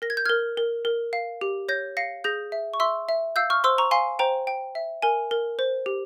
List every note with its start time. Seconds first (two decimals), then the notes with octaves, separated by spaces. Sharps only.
0.02 A#4 A#6
0.10 G#6
0.17 G6
0.25 A#4 F6 G#6
0.57 A#4
0.85 A#4
1.13 F5
1.41 G4
1.69 C#5 G6 A#6
1.97 F5 A#6 C#7
2.24 G#4 G6 A#6
2.52 E5
2.74 C#6
2.80 E5 C6 E6
3.09 E5
3.36 F5 E6 G6
3.50 C#6 F6
3.64 C5 C6 E6
3.78 A#5 C#6
3.91 F5 G#5 C6
4.19 C5 G5 A#5
4.47 G5
4.75 E5
5.02 A#4 G#5
5.31 A#4
5.59 C5
5.86 G4